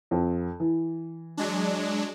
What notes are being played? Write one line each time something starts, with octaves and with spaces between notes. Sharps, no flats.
F2
E3
F#3 G#3 D4